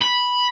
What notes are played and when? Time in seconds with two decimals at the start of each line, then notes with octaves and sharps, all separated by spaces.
0.01 B5